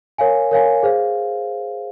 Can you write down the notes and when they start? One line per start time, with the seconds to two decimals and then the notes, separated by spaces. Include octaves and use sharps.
0.18 A#4 C#5 F5 G#5
0.51 A#4 C#5 F5 G#5
0.83 G#4 C5 F5